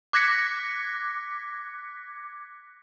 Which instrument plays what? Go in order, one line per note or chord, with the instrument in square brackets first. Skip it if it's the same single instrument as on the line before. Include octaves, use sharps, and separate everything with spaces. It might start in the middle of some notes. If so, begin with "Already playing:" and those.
[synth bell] D6 F#6 G#6 A#6 B6 C#7